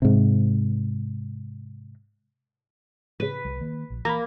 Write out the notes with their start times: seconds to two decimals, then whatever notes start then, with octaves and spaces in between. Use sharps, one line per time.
0.02 G#2 C3
3.20 A2 C#3 B4
3.45 C2 G3
3.60 D#3 A#3
3.90 A#1
4.05 E3 A#3 A#5 B5